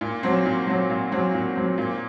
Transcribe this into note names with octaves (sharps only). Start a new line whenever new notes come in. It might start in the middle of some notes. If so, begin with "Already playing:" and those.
A#2
F#3 C4
A#2
F#3 C4
A#2
F#3 C4
A#2
F#3 C4
A#2